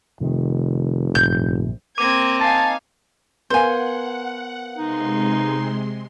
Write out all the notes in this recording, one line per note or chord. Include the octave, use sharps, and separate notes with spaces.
F1 C3 D#3
A#1 G2 D3 G6
A#3 C4 D6 G#6 D#7
D#4 F5 G#5 A5
B3 A#4 C5 F5 F#5 G#5
C3 G#3 D#4 C6